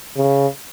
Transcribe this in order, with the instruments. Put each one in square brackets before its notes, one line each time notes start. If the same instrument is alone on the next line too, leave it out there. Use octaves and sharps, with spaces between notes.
[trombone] C#3